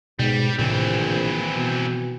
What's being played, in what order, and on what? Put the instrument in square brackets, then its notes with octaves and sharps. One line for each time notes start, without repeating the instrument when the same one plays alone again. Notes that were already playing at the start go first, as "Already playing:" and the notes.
[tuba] G#2 [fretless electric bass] B2 [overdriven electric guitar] G3
[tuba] A#1 [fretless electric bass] A2 C3 D#3 [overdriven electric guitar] E3 C4
[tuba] B2